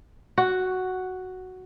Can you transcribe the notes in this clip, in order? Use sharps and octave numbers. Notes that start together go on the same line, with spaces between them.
F#4